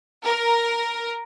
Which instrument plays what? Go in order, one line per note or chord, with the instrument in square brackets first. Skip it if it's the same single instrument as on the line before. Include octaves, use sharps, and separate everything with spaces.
[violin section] A#4